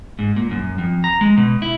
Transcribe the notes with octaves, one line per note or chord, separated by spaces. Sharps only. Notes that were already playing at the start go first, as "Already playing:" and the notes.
G#2
A#2
F#2
F2
A#5
G#3
B2
E4